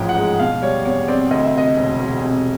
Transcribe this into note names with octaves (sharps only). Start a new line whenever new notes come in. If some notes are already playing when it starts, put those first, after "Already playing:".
Already playing: A1 G#2 F3 G5
F#5
G#3
B2 F5
G3 C#5
E2 C#5
C4 D5
D2 D#5
E5
C3 D#5
E1
E1
C3